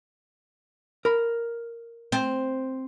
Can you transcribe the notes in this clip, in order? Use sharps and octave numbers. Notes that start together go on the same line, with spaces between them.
A#4 B5
C4